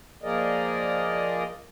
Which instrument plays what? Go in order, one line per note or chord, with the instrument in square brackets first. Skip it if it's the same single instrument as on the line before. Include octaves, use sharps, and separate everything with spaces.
[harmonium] F3 A#3 G#4 A#4 D5 D#5